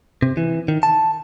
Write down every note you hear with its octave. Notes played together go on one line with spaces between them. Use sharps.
C3
E3
D#3
A5